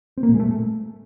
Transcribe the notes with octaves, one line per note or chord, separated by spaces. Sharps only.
C4
A#3
A#2
G#3
A3